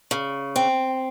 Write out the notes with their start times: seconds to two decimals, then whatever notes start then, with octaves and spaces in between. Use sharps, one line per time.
0.11 C#3
0.56 C4